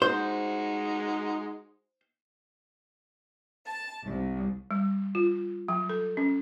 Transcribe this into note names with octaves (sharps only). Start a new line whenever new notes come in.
G#3 D#4 F#4 C5
A5
C2
G3
F4
F#3
A4
C#4